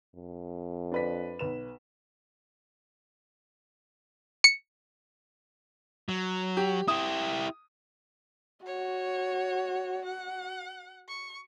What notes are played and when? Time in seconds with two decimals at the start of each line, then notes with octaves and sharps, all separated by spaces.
0.15 F2
0.92 D4 B4 B6
1.39 B1 B4 E7
4.44 C#7
6.09 F#3
6.57 G4
6.88 E4 G4 D#6
8.66 F#4 C#5
10.05 F#5
11.09 C#6